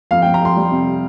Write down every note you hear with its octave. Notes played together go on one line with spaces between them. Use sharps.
F2 F5
F2 G5
A#5
F2 C6
G3
C3